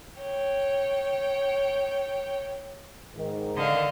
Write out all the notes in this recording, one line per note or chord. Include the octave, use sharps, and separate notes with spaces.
C#5 G5
G#2 D#3
D3 D#5 F5